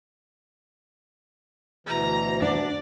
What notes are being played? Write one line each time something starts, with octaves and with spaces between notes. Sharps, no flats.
D2 B2 E3 A#5
D4 D5 F#5